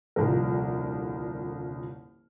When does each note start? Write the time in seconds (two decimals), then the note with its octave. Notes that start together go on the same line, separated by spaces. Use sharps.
0.16 D#1 C2 D3 F3 A#4